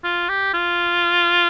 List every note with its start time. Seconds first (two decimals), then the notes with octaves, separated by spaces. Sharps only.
0.04 F4
0.29 G4
0.54 F4